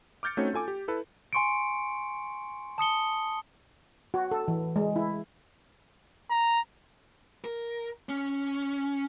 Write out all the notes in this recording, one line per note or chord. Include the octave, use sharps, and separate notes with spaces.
D6 F6 G6 A6 C#7
A3 C4 C#4 D#4 F#4 C#5
F4 A4 G#5 D6
G4
E4 A4 B4
G#5 C6 C#6 C#7 D7
A5 D#6 C#7 G7
F#4
A4
E3
G#3
E4
A#5
A#4
C#4